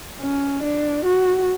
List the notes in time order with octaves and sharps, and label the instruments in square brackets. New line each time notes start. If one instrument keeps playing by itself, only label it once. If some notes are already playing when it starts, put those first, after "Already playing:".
[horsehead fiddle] C#4
D4
F#4